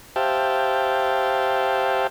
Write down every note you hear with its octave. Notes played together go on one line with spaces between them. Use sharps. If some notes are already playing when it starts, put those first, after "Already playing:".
G4 C5 E5 F5 G5 A5